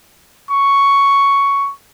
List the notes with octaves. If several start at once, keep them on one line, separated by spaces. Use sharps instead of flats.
C#6